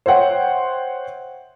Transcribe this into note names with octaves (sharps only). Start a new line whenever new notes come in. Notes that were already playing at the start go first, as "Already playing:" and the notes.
C5 C#5 E5 F#5 G5